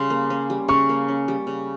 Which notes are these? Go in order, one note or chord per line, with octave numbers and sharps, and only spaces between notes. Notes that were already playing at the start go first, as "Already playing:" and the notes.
Already playing: C#3 G3 C#4 C6
A#3
C#4
G3
C#3 C#6
A#3
C#4
G3
C#3